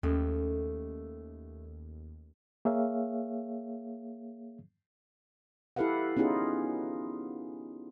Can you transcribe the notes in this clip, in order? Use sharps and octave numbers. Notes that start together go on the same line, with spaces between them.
D#2 A3 C#4 A4
A#3 G#4 C#5 E5 F5
E4 G4 A4 B4 F5 F#5
B3 C#4 D#4 F4 G#4